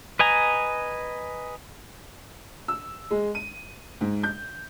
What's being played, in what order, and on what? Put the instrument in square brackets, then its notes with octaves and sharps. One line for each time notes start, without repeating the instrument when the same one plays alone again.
[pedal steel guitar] B4 D#5 G#5 A#5
[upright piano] E6
G#3
D#7
G#2
G6